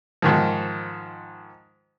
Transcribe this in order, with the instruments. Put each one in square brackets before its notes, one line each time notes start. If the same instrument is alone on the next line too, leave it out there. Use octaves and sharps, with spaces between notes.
[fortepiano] G#2 D#3 F3